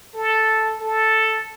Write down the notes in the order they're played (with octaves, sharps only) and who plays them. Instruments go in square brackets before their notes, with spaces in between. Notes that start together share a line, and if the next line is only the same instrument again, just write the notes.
[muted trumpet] A4
A4